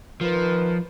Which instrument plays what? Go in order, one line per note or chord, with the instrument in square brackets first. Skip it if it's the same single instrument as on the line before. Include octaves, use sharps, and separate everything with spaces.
[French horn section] D#3 A#4 B4 [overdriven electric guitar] F3